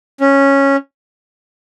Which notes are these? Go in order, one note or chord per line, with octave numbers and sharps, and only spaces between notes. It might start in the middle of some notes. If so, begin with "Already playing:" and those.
C#4